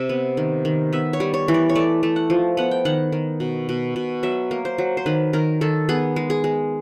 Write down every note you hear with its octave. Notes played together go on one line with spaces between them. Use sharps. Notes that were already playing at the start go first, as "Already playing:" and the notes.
Already playing: C3 E5
B3
D#3
D#3
B3 E5
C#5
G3
C#5
E3
D5
C#5
A3 D5
A3
F#5
F3
B3 F#5
G5
D#3 F#5
D#3
B2
B2
B2
F#3 E5
A#3
C5
F#3
C5
D#3 B4
D#3 A#4
D#3 A4
B3 G#4
G#3
G#4
G#3